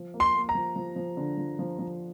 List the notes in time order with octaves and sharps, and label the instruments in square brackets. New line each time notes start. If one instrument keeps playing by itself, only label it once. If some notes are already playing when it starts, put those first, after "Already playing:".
Already playing: [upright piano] F3
A#3
[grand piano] C6
[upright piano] A#3
[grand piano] A#5
[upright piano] F3
F3
F3
D3
F3
F3
F3